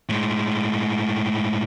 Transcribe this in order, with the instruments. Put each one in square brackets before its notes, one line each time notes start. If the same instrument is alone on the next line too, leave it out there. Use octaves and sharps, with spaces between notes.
[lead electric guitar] A2 G#3